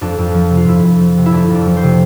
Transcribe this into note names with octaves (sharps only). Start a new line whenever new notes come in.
F2 D4
F2
F3
C3
F4
F2 E4
F2
F3
C3
E4
F2 D4
F2
D4
F3
C5
C3